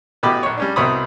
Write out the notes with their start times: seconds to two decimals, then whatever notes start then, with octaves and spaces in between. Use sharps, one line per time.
0.23 A1 B2 G4 B5 D6
0.43 A#1 C#5
0.57 G3 C#4 D4
0.76 C2 B2 C4 C#5 B5 D#6